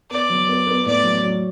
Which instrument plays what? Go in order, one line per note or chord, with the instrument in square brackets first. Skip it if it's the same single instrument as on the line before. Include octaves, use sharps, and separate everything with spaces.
[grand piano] B3 [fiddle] D5
[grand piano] F#3
B3
B3
[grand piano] A2 [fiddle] D5
[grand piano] F#3
F#3